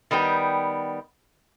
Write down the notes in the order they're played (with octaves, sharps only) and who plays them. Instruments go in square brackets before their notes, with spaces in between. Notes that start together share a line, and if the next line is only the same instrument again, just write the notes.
[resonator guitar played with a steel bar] D#3 G3 B3 G5